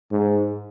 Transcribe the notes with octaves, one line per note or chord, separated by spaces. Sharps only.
G#2